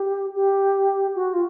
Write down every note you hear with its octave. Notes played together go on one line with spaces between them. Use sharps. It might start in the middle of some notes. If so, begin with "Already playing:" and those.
Already playing: G4
G4
F#4
F4